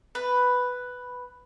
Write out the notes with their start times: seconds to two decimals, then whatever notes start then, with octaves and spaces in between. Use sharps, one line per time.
0.15 B4